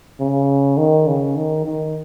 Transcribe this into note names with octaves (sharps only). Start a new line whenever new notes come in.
C#3
D#3
C#3
D#3
D#3